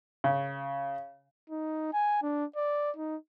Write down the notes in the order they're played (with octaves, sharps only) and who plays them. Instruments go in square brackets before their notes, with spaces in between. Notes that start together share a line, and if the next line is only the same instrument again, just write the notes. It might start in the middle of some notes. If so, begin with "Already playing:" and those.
[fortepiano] C#3
[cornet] D#4
G#5
D4
D5
D#4